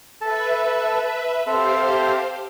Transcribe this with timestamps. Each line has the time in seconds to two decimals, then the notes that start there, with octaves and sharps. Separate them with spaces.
0.21 A4 B4 E5 A5
1.47 C4 G4 A4 C5 E5 F5